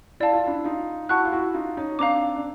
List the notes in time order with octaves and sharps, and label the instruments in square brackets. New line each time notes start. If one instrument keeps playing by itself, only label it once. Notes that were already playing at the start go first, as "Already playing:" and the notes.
[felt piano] E4 [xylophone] D5 F5 A5
[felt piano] F4
D4 E4
D#4 F4
[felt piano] E4 F#4 [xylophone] F#5 A5 C#6 F#6
[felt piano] F4
E4 F#4
D#4 F4
C#4 D#4
[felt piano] C4 D4 [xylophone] F5 A#5 D6
[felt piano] D4